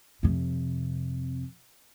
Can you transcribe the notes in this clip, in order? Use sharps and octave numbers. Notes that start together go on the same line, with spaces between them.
F2 C3